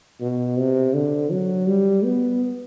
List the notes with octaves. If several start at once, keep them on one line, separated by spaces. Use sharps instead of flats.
B2
C3
D3
F#3
G3
B3